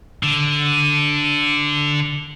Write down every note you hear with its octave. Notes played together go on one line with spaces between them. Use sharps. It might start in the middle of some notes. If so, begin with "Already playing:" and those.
D3